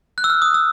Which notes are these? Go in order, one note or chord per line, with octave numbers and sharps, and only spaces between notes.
F#6
E6
F6
D#6
E6